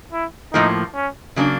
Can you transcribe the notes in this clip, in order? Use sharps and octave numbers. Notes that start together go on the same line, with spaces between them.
E4
A2 F3 A#3 D#4
C#4
C#3 F#3 A#3 D4